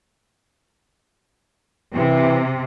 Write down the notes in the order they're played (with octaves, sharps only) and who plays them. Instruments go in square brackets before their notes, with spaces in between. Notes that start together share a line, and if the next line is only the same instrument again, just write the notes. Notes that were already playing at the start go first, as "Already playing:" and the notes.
[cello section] C3 [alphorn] E3